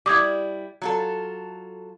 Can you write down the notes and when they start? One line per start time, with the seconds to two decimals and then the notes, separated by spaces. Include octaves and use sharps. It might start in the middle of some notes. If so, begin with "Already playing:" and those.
0.06 G3 E4 D6 D#6 G#6
0.82 F#3 F4 A4